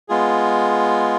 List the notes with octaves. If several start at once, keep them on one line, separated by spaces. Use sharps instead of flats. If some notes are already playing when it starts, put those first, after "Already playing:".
G#3 B3 F4 G#4